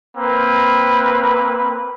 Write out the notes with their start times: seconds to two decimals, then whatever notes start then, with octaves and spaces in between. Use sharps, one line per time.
0.17 A#3 C4 B4